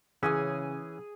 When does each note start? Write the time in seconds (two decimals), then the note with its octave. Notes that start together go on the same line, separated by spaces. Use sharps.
0.23 C#3 E3 C#4 G#4 G#5 D#6